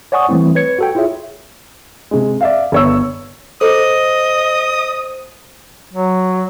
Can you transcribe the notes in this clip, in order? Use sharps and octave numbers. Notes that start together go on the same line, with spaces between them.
C#5 D5 F#5 G#5 C#6 D#6
E3 G3 A3 C4 E4
B4 C#5 G#6 C#7
F#4 A4 G5
E4 F4 G#4 C#5 E5
C3 G#3
D5 E5 F5
G1 C#5 E6
A4 C5 D#5 A#5 D#6
F#3